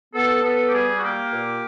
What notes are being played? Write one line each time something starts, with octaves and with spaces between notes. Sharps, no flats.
B3 A4
B3 A4
G4
G3 G#4
F#4
A#3 G4
A#2